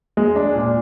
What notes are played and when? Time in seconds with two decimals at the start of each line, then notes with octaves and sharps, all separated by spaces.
0.17 G#3
0.36 D4
0.54 A#2